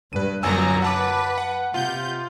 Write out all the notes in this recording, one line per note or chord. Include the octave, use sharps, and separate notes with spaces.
G2 B4 D#7
G1 F#2 F#3 G#5 A#5 E6
B4 F#5 A5 D6
F#5
C3 F4 G6